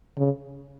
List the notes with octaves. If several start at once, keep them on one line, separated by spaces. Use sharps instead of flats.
C#3